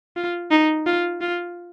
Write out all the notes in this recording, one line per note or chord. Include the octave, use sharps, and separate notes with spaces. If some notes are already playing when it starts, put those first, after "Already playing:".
F4
D#4
F4
F4